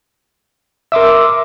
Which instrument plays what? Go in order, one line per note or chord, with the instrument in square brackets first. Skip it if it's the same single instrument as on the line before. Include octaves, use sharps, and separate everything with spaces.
[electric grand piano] A#4 E5 [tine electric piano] C6 D6 E6